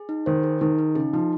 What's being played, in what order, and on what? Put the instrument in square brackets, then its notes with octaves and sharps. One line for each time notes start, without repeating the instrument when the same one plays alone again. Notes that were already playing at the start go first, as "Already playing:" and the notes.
Already playing: [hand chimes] G#4
D#4
[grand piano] D#3 [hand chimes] C5
[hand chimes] G#4
[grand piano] D#3 [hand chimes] D#4
[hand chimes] D#4
[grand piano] C#3 [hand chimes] G#4
[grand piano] F3 [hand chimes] D#4